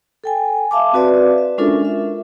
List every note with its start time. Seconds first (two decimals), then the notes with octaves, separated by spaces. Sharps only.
0.24 A4 G5 G#5
0.71 E5 F5 A5 D6
0.93 C4 F#4 B4 D5 E5
1.38 E5
1.58 G#3 C#4 D4 F4 A4 A#4
1.85 E5